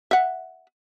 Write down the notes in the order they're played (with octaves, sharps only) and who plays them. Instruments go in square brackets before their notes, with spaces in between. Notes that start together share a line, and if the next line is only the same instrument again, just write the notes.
[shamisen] E5 F#5